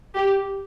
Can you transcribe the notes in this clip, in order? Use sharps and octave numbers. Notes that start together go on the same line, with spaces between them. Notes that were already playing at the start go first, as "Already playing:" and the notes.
G4